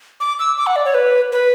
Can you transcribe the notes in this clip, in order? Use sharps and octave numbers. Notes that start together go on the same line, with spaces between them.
D6
E6
D6
F#5
D5
C#5
B4
B4